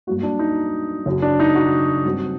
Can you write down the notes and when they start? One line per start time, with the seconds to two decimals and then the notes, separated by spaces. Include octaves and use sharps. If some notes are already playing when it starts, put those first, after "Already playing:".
0.07 G2 F#3 A#3 F#4
0.23 D4
0.39 D#4
1.06 F#1 F#2 F#3
1.22 D4
1.40 D#4
1.55 F#4
2.05 G2 F#3 C4